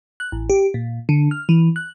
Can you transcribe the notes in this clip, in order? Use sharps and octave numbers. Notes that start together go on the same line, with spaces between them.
F#6
A1
G4
A#2
D3
F6
E3
F#6